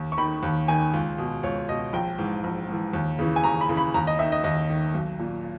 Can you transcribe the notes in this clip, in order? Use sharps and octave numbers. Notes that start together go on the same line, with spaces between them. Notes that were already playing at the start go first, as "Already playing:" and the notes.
Already playing: D#2
C#6
D#3 B5
D#2
D#3 G#5
C#2
B2
C#2 C#5
B2 D#5
A#1 G5
G#2 E3
A#1
G#2 E3
D#2
C#3 E3
G#5
D#2 A#5
B5
C#3 E3
B5
D#2 A#5
D#5
D#3 E5
D#5
D#2 D#5
D#3
B1
A#2